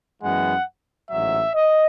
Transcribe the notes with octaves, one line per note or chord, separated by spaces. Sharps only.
F#2 E3 G#3 B3 F#5
A1 G#2 F#3 E5
D#5